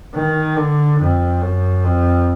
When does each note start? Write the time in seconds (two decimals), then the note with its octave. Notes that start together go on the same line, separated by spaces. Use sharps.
0.14 D#3
0.57 D3
1.00 F2
1.42 F#2
1.84 F2